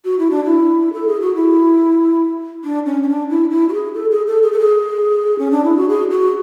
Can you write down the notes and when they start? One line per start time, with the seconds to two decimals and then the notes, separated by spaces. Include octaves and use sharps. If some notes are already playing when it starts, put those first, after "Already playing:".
0.05 F#4
0.19 E4
0.31 D4
0.45 E4
0.93 A4
1.07 G#4
1.21 F#4
1.35 E4
2.64 D4
2.86 C#4
3.03 C#4
3.09 D4
3.30 E4
3.51 E4
3.69 F#4
3.73 G#4
3.95 A4
4.11 G#4
4.27 A4
4.43 G#4
4.52 A4
4.59 G#4
5.39 C#4
5.51 D4
5.64 E4
5.77 F#4
5.89 G#4
6.11 F#4